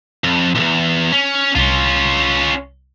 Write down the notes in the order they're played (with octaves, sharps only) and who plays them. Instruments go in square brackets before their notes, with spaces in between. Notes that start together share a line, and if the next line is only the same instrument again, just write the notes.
[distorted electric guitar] F2
B1 E2
C#4
[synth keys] C2 [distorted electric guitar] C#4 F4